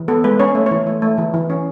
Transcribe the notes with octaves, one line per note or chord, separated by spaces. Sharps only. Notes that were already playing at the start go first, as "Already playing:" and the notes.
Already playing: E3
B3 A4
G#3 B4
C#4 C#5
A3
E3 C#5
A3
A3
E3
E3
C#4